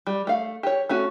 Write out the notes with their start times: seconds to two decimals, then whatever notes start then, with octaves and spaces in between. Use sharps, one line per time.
0.07 G3
0.27 A3 F5
0.63 G4 C#5
0.89 A3 C#4 F#4 A4